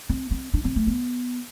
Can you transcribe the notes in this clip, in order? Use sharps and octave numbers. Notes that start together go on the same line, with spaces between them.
C4
C4
D4
C4
A3
B3